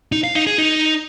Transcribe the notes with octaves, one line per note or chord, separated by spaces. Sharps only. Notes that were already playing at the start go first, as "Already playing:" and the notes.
D#4
F5
D#4
G#4
D#4